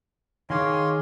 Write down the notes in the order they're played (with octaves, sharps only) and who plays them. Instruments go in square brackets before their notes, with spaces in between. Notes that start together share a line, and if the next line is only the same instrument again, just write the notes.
[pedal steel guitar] D#3 G#4 D6 [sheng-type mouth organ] C#5 F5 C6